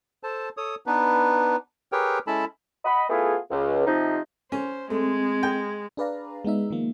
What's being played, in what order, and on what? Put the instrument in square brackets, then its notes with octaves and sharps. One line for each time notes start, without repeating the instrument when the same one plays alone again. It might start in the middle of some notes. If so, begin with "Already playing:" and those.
[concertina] A4 C5 A5
A4 C#5 D#6
B3 D4 D#4 B4
G4 G#4 A#4 B4 C#5 G5
G#3 C#4 E4 A4 A5 B5
[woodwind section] D#5 F#5 B5
A3 B3 E4 F4 G#4
C#2
C3 F3 D#4
[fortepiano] C#4 [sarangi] C5
[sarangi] G#3 [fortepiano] A3 [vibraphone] C4
[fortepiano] G5
[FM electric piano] D4 G#4 B4 D5 F5 A#5
G#3 B3 D#4 E5
D#3 F3 A#3